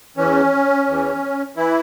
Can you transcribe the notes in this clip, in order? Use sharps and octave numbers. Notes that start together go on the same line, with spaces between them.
E2 E3 C#4
E2 E3
E3 E4